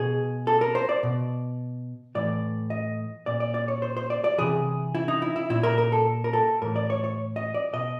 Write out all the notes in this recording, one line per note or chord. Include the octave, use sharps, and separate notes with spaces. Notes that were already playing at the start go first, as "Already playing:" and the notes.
Already playing: B2 G#4
A4
A#4
C5
D5
B2
A2 E3 D5
D#5
A#2 D5
D5
D5
C#5
C5
C5
D5
D5
C3 E3 G#4
E4
D#4
E4
E4
A#2 E4
A#4
A#4
A4
A#4
A4
A2 E3 A#4
D5
C#5
C#5
D#5
D5
B2 D#5